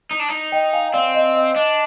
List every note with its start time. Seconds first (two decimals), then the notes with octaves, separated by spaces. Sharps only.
0.11 D#4
0.19 D4
0.29 D#4
0.52 D#5 G5
0.73 F5 G#5
0.94 C4 D5 F5
1.15 D#5
1.35 D#5
1.56 D4 D#5